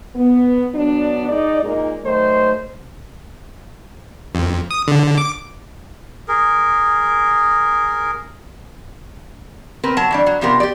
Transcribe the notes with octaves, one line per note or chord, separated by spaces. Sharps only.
B3
F#3 B3 D4
G#3 D#4 D5
A#2 G#3 A#3 D#4
D#3 F#3 A3 C5
F2
D#6
D3
D6
G#4 A#4
C4 A#4 B4
F#3 A5
E3 G3 D4
F#3
C3 F3 B3 G4 A#4
G4 D5